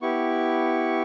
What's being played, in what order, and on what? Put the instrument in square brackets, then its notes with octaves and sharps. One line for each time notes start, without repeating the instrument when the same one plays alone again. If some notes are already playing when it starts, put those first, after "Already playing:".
[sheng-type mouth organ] B3 E4 G4 C#6